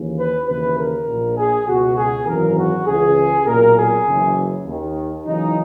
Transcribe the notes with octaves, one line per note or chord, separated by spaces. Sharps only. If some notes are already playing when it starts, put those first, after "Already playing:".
Already playing: D#2 C#3 E3
B4
D#2 C#3 E3 B4
A#4
A#1 A#2
G#4
C#2 B2 F#4
G#4
G#1 F#2 C#3 E3 A#4
F#4
C#2 C#3 E3 G#4
B1 A#2 A#4
G#4
F#1 F#2 C#3 E3
D#2 D#3
F#1 F#2 C#3 E3 D#4